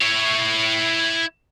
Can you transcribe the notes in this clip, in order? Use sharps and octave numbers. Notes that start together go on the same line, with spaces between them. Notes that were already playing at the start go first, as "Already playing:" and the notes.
E4 C#5